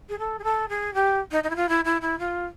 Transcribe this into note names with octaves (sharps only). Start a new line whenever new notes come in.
G#4
A4
G#4
A4
G#4
G4
D#4
D#4
E4
F4
E4
E4
E4
F4